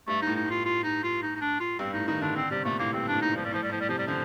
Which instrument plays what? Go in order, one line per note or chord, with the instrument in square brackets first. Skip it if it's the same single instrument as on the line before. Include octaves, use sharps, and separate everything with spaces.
[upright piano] G2 [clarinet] A3
[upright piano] A2 [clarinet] D#4
[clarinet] D#4
[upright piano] A2 [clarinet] F4
[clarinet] F4
D#4
F4
D#4
D#4
D4
F4
[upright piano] G2 [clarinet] C4
[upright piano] A2 [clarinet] D#4
[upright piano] D#3 [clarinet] D#4
[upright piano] D3 [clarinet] D4
[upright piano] D3 [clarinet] C4
[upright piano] C3 [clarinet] G3
[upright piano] A#2 [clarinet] A3
[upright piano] A2 [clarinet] A#3
[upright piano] G2 [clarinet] C4
[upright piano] A2 [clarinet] D4
[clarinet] D#4
[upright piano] G2 [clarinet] F3
[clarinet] G3
[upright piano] A2 [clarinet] F3
[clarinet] G3
[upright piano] A2 [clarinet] F3
[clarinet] G3
[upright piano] C3 [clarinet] F3
[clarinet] G3
[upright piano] D3 [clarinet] F3